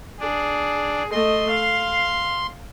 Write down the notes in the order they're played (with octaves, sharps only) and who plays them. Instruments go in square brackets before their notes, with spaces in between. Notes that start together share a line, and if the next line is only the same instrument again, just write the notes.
[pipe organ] D4 [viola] G#4
[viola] A3 D#5 [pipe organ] C6
[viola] F5